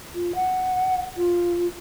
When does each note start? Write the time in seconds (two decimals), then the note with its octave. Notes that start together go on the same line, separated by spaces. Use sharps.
0.15 F4
0.35 F#5
1.17 F4